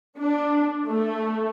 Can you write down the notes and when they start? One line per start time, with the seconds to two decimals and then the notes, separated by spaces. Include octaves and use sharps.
0.19 D4
0.86 A3